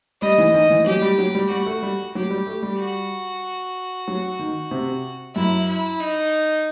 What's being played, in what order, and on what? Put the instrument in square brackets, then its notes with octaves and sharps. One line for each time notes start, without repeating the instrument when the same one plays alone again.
[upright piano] G3 [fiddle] D#5
[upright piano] E3
D#3
E3
[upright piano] F#3 [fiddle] G4
[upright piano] G3
F#3
G3
[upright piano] G3 [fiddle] F#4
[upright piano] A3
G3
[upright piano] F#3 [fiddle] G4
[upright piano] G3
A3
G3
[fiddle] F#4
[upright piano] F#3
D#3
C3
[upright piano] F#2 [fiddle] E4
[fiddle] E4
D#4